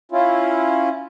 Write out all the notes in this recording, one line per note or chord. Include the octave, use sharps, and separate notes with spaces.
C#4 E4 F4